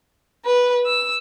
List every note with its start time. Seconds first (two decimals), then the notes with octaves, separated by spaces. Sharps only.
0.43 B4
0.85 E6